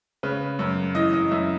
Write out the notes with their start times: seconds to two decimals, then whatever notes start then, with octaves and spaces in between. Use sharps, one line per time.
0.23 C#3 B4
0.59 F#2
0.95 E3 D#5
1.13 D#5
1.31 F#2 E5